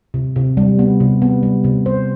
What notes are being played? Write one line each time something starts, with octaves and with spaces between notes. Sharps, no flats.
C3
C3
G3
B3
C3
B3
G3
C3
C5